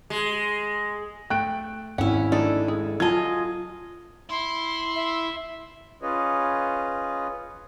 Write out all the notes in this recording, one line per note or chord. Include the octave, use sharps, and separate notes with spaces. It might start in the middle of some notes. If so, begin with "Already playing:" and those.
G#3
A3 G5 F#6 D7
G#1 C#4 E4 F#5
A3 D4 D#4 A4
G#3
F#3 F4 D#5 G#5 A5 G#6
E4 C6
E5
C#4 F4 G#4 B4 C#5 D#5